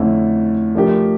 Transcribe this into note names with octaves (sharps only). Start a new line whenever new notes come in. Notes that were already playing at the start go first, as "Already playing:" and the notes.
Already playing: F2 D3 A3 C#4 E4
F3 A3 D4 G4 A#4